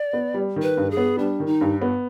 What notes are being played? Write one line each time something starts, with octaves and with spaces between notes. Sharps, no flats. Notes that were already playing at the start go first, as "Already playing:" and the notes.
Already playing: D5
B3
G3
D#3
B4
G2
G#4
B3
G3 D4
D#3
D#4
G2
B3